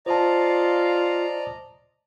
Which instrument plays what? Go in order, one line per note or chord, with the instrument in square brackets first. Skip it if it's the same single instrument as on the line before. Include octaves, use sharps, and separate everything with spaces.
[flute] F4 [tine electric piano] C5 A5 [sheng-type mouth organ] D5 D#5 A#5